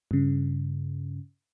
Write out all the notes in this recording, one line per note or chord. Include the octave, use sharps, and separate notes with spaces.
G2 C#3